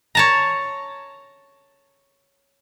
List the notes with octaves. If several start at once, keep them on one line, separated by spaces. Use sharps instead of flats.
C#5 A5 A#5